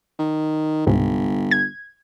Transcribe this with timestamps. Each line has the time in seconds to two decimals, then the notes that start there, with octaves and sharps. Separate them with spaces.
0.19 D#3
0.87 G1 C#2 G#2 C3
1.51 G#6